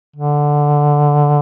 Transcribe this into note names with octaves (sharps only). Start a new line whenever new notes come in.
D3